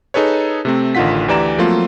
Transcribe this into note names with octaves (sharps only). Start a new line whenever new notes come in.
D#4 G#4 A4 B4 C#5
C3 A3 C4
A1 D3 D#3 F4 F#5 B6
D2 E3 G4 D5 A#5 E7
F3 F#3 A3 A#3 C4 F4